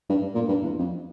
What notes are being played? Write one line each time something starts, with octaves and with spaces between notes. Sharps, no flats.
G2
G2
A#2
G2
E2
F2